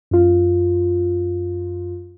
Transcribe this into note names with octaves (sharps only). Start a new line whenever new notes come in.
F#2 F4